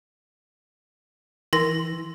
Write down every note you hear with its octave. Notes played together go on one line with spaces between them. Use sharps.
E3 A#4 C6 A#6